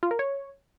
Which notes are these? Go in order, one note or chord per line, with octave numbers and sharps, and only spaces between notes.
F4
A#4
C#5